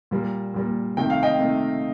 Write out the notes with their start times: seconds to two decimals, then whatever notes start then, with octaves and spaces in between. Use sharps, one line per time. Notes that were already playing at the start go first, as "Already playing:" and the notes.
0.11 A#2 G3 A#3
0.54 A#2 G3 A#3
0.97 C3 D#3 A3 G5
1.10 F5
1.23 D#5 G5
1.39 C3 D#3 A3